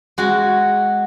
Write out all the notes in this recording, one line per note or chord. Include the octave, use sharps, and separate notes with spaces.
G#3 F#4